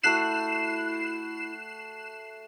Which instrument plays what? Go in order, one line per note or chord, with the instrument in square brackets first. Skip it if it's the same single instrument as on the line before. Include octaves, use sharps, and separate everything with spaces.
[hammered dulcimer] A3 F#4 F#5 [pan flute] E4 [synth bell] F#6 C7 E7